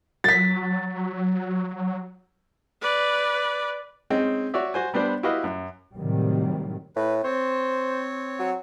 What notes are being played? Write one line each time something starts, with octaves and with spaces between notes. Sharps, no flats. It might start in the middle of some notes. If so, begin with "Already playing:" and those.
F#3 A6 B6
B4 D5
G#3 C4 C#4 D#4
F#4 C#5 D5 E5
F#4 C5 G#5
G3 B3 D4 C5 D5
E4 F#4 G4 B4 D#5 F5
F#2
A2 C3 D#3 F#3 G3
A2 B4
C4 C5 C#5
F#3